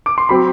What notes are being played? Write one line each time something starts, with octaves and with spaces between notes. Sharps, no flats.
D6
C6
F#3 C4 B5